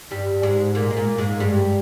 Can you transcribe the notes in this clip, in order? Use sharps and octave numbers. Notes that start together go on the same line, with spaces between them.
G2 G3
G#2 G#3
A#2 A#3
G#3
A#2 A#3
G#2 G#3
G2 G3